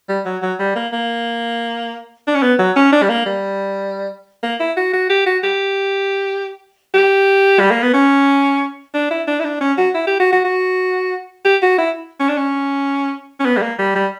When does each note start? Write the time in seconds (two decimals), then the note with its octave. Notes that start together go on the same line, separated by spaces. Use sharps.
0.09 G3
0.25 F#3
0.42 F#3
0.59 G3
0.76 A#3
0.92 A#3
2.27 D4
2.35 C#4
2.43 B3
2.59 F#3
2.76 C#4
2.93 D4
3.03 G3
3.09 A#3
3.26 G3
4.43 A#3
4.60 E4
4.77 F#4
4.93 F#4
5.10 G4
5.26 F#4
5.43 G4
6.94 G4
7.60 G3
7.71 A#3
7.83 B3
7.94 C#4
8.94 D4
9.11 E4
9.27 D4
9.40 E4
9.44 D4
9.61 C#4
9.78 F#4
9.94 E4
10.07 G4
10.20 F#4
10.32 F#4
10.45 F#4
11.45 G4
11.62 F#4
11.78 E4
12.20 C#4
12.28 D4
12.37 C#4
13.40 C#4
13.45 B3
13.57 G3
13.62 A#3
13.79 G3
13.95 G3